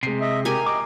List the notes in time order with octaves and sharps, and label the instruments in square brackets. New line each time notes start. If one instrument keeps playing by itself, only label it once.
[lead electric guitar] C3 [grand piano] G#3 C7
[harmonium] D#5 E5
[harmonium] G4 [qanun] A#4 G#5
[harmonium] D#5 [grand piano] D6